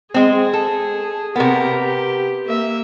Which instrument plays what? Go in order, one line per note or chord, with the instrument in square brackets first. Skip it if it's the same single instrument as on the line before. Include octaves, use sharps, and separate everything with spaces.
[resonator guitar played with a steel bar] G#3 C4 [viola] G#4
[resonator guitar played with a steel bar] A4
[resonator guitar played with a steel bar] C3 B3 [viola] G4 A#4
[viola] G4
A#3 E5